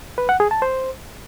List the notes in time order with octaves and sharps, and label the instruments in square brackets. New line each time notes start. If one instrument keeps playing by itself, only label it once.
[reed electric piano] B4
F#5
G#4
A5
C5